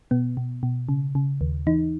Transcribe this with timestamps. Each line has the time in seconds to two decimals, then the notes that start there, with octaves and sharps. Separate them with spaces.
0.11 B2 B3
0.37 B2
0.63 B2
0.89 C#3
1.15 C#3
1.41 D#2
1.67 E3 D#4